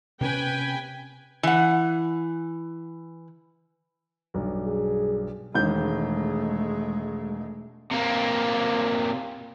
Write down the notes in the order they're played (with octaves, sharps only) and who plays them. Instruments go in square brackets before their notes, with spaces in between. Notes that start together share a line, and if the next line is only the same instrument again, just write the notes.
[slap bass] C3 C4 C#4 [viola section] B4 G5 G#5
[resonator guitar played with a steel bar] E3 F#5
[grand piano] B1 G2
[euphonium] G#4
[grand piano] E1 D#3 G6 [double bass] G#3 A3
[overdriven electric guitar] C3 A#3